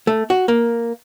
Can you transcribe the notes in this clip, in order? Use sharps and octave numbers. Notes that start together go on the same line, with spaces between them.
A3
F#4
A#3